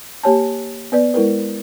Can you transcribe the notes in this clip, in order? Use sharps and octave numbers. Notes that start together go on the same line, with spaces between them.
A#3 G4 C#5 G#5 A5
B3 B4 D5
G#3 E4 A#4 B4